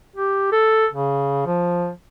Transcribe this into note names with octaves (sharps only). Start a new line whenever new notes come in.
G4
A4
C#3
F3